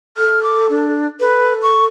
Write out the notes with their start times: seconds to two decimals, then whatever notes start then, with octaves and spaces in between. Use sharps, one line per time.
0.17 A4 F6
0.43 D6
0.70 D4
1.20 A4 B4
1.63 C#6